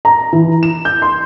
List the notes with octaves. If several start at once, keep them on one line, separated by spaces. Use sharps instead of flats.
A#5
E3
E7
G6
C6